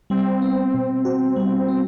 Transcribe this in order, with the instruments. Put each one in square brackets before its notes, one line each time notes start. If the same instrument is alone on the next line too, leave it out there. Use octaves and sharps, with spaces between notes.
[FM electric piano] G3 [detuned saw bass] C4
[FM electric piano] B3
B2
F#4
G3
B3